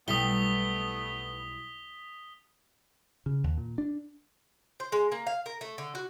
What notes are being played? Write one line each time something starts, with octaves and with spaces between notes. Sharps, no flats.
B1 G3 A3 B3 E4 D#6 B6 G7
C#3
D#2
A#2
D4
C5
G#3
A#3
F5
A#4
A3
D3
F#4